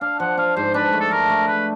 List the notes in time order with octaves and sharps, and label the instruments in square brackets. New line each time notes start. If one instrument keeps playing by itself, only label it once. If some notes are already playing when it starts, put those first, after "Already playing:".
[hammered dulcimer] D4 [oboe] F5
[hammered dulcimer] F3 [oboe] F#5
[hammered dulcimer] D4 [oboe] F5
[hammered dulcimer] G#2 [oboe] C5
[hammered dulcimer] D4 [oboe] B4
[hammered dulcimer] A3
[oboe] A4
[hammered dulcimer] A3 [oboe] A#4
[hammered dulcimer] A3
[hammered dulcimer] A3 [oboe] B4